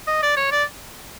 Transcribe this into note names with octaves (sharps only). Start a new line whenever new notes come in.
D#5
D5
C#5
D5